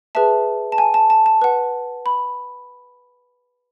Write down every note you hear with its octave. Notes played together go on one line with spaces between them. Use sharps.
G#4 B4 E5 A5
A5
G#5
A5
A5
A5
B4 F#5
B5